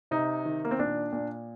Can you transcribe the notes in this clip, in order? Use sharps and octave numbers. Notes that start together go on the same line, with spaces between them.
C3 D#4
D#3
A#3
C4
A#2 D4
A#2